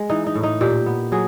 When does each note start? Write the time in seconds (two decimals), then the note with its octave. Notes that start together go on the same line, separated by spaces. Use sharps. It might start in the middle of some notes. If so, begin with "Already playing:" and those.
Already playing: G#3
0.10 E3 D#4
0.27 D#4
0.35 A2
0.43 D#4
0.61 A#2 G4
0.86 B3
1.12 F#3 G#4